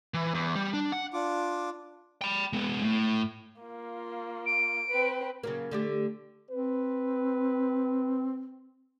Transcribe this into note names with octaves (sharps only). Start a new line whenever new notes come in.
E3
E2
G3
D4
F#5
D4 F4 D6
G5 B5
G#3 B3
A2
A#3 F4
D7
C4 B4
C#3 F#3 A#3
D3 A3 G4
C4 B4